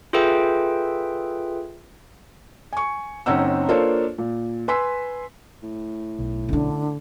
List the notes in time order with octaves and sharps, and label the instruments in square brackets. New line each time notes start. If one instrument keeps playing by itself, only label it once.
[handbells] F4 G#4 A4 B4 E5 G5
[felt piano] G#5 C#6
F#1 C4 C#4 D#4 F#5 E6
A#3 D4 F4 A4 C5 C#5
A#2
B4 G#5 C6 E6 B6
[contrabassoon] A2
[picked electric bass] B1
[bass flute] D3 [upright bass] C#4 D4